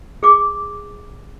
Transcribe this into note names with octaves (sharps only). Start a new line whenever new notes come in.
G#4 D6